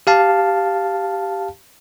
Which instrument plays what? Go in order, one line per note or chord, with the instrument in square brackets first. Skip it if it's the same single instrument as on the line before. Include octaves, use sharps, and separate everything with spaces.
[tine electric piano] G4 F5 A5